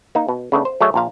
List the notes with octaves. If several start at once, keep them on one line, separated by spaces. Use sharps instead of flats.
A#3 D#4
B2
C#3 A3 B3 D4
C5
F#3 A3 G#4 C#5 D#5 E5
A#1 A#2 F5